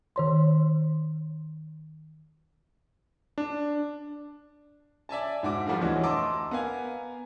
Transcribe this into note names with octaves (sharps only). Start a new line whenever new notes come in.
D#3 C#5 C6
D4
D5 E5 G#5 A5
G#2 F#4 D6
F3 G3 A3 D4 F#4 F5
D2 E3 F#4 C#5 D#5
D#5 A5 A#5 C6 D6 E6
B3 A#4 F5 G#5